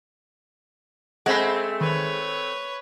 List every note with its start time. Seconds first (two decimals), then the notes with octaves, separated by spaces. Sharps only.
1.26 G#3 A3 C4 F#5 B5
1.81 D#3 B4 C#5